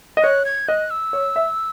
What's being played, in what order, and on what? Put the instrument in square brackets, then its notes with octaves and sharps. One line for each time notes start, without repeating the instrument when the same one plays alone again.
[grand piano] D#5
[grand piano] C#5 [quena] F#6
[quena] G#6
[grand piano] D#5 [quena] F#6
[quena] E6
[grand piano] C#5
E5